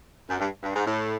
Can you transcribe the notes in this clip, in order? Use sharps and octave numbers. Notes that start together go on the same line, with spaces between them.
F#2
G2
G2
G#2
A2